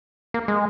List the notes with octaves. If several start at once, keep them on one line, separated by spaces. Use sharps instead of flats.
A#3
G#3